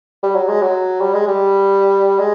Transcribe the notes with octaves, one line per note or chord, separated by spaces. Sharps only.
G3
F#3
G#3
F#3
G3
G#3
G3
G#3